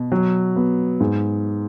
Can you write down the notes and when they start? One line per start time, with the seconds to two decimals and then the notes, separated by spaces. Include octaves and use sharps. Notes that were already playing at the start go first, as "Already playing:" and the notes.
Already playing: B2
0.12 F#3
0.56 B3
1.00 G#2